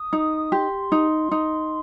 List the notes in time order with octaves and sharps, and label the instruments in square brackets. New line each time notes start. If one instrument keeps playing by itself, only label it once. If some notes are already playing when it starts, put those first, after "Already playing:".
Already playing: [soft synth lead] D#6
[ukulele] D#4
[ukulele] G4 [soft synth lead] C6
[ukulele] D#4
D#4